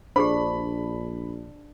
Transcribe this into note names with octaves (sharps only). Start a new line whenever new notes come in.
A#1 D4 G4 G#4 C5 B5